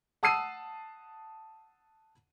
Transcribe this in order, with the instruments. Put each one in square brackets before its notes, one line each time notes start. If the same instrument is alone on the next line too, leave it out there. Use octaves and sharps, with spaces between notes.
[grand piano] F#5 A5 D#6 E6 C7 D#7